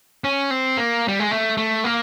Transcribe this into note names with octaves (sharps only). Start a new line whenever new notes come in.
C#4
C4
A#3
G3
G#3
A3
A3
A#3